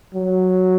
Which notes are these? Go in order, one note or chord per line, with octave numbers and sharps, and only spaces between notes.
F#3